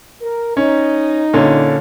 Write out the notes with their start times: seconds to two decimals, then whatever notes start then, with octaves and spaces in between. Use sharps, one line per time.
0.22 A#4
0.57 C#4 D#4
1.33 A#2 D3 C#4